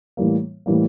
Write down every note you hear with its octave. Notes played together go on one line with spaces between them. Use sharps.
A2 E3 G3 A#3
A2 E3 G3 A#3